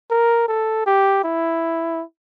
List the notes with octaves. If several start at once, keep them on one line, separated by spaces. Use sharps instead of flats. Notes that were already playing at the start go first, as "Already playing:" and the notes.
A#4
A4
G4
E4